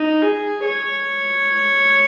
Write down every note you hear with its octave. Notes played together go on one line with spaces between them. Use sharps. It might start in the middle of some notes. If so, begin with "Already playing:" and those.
Already playing: D#4
G#4
C#5